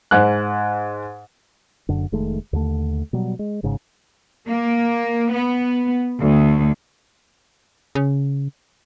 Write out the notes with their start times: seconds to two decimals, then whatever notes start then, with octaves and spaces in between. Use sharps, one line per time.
0.11 G#2 F#6
1.89 F#1 F#2 D3
2.12 F1 D#3 G#3 A3
2.53 D#2 D3 A3
3.13 B2 F#3 G3
3.39 G#3
3.63 G#1 G#2 C#3
4.48 A#3
5.33 B3
6.21 D2
7.95 C#3